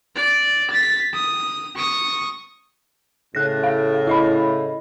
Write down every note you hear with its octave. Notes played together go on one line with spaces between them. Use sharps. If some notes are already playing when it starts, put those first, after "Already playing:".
D5
A6 B6
D#6
C#6 D#6
A2 C#3 F#6 A#6
F5
E4 D#5 B5